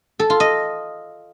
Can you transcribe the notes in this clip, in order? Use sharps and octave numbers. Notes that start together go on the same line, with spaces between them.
A4
F4
D#5